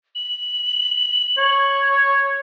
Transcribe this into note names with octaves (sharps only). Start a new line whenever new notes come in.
F#7
C#5